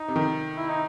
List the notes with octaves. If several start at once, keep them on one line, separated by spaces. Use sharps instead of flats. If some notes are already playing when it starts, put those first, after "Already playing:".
Already playing: D#4
C3
D#3
E4
D#4